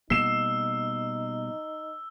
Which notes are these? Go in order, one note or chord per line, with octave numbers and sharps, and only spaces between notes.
B2 G3 A#3 D#4 E6 C7 E7